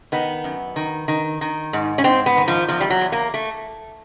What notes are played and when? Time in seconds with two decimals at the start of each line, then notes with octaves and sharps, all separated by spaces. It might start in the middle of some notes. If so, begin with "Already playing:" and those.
0.12 D#3 B3
0.44 F#2
0.76 D#3
1.08 D#3
1.41 D#3
1.73 G#2
1.98 C#4
2.04 G#2 C4
2.26 B3
2.37 D#3
2.48 F3
2.69 E2 F3
2.81 G3
2.90 F#3
3.01 E2
3.12 A#3
3.34 A3